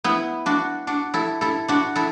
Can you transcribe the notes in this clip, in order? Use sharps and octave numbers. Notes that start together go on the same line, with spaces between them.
B3 E4
D4 F#4
D4 F#4
E4 A4
E4 A4
D4 F#4
E4 A4